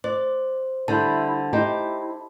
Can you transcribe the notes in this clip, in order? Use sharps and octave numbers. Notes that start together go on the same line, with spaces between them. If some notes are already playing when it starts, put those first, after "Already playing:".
C5 D5
D3 G3 E4 C5 A5
D#4 E4 G4 C5